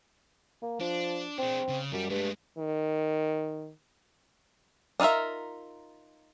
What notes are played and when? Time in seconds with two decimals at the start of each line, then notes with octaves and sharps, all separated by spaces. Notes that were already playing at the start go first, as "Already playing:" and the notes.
0.62 A#3
0.80 F3 D4
1.38 C4 D4 G#4
1.69 C#3
1.92 F#2 G3
2.10 G2 G#3 A3
2.58 D#3
5.00 D4 D#4 F4 A#4 E5